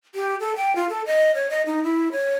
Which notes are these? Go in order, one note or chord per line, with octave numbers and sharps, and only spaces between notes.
G4
A4
G5
F4
A4
D#5
C#5
D#5
D#4
E4
C#5